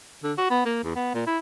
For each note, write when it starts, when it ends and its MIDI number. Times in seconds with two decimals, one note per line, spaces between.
0.24 0.33 50
0.38 0.46 66
0.51 0.64 59
0.65 0.82 58
0.84 0.92 40
0.96 1.11 59
1.14 1.24 46
1.27 1.38 64